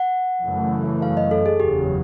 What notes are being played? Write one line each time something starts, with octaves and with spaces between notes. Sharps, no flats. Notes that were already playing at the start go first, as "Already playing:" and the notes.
Already playing: F#5
F#2 C#3 E3 A3
F5
D#5
A4
G#4
F#1 E2 C#3 F#3 G4